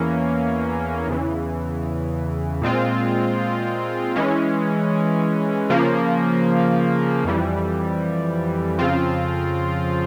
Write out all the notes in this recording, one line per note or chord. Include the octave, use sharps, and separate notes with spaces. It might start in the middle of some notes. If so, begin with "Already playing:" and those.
Already playing: E2 E3 A#3 C#4
E2 C#3 E3
A#2 G#3 C4 F4
E3 G#3 C#4
C#3 F3 A#3
F2 E3 G3
F2 C#3 F3 C4 F4